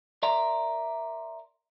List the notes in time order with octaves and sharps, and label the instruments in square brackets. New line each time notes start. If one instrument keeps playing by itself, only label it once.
[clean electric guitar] A#4 D5 E5 A#5 C6